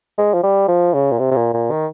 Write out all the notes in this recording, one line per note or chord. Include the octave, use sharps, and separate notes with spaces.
G#3
F3
G3
F3
C#3
A#2
C3
C3
A#2
A#2
D#3